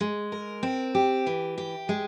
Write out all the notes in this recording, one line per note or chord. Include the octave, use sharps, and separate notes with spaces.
G#3
A#4
C4
G4
E3
G4
G#3